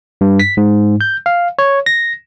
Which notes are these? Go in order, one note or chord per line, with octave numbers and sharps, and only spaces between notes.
G2
B6
G#2
G6
F5
C#5
A#6